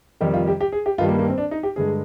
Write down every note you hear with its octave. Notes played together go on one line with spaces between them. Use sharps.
F2 C3 D#3 G3 G4
F4
G4
G4
G#4
G4
G2 D#3 G3 F4
A#3
A#3
C4
D4
D#4
G4
G2 D3 G#3 G#4